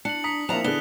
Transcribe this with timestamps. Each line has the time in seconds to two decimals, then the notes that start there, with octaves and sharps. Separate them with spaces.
0.05 D4 C#7 F#7
0.24 A#5 D#6 B6 C#7
0.49 F3 A#3 C4 D4 E4 A#5 F7
0.64 D3 E3 B3 D4 G#4 F#6 G7